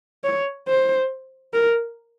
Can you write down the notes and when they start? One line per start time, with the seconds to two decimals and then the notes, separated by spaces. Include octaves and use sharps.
0.24 C#5
0.68 C5
1.53 A#4